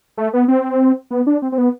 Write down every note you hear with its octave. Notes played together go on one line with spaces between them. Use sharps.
A3
B3
C4
B3
D4
C4
C4
B3